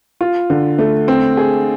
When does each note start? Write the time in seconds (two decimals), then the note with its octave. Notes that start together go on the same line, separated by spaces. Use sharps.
0.21 F4
0.50 D3
0.79 A3
1.08 C4
1.37 G#4